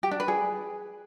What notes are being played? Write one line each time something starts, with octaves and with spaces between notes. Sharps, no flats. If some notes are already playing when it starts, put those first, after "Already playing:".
G4
D4
B4
G#4